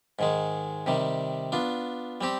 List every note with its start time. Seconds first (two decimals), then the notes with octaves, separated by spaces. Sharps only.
0.19 G#2 D#3 G#3
0.86 C3 D#3 G3
1.52 B3 D4 F4
2.21 G3 C4 G4